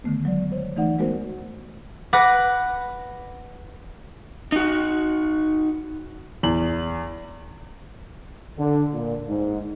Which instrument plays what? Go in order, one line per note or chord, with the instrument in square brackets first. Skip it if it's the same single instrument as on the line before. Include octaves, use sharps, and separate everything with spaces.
[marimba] D3 D#3 A3 B3
F#3 G#3 D5
C5 C#5
E3 A3 D#4 D5 F#5
G#3 A3 B3 F#4 A#4 C5
[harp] B4 F#5 D6 F#6 A#6
[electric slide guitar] D#4 F#4
[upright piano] E2 F#7
[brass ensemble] D3
A#2
G#2